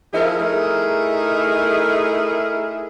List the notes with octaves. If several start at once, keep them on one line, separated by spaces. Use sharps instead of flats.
F3 D#4 E4 G#4 A#4
A3 D#4 E4 G#4 A#4